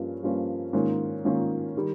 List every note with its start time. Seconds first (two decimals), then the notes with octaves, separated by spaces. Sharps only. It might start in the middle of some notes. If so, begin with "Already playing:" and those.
Already playing: G2 F3 A#3 C#4 F4
0.23 G2 F3 A#3 C#4 F4
0.73 G#2 D#3 A#3 C#4 F4
1.24 G#2 D#3 A#3 C#4 F4
1.77 D#3 G3